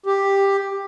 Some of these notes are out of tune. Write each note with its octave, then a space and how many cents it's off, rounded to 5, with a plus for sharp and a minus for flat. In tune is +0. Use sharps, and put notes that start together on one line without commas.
G4 +10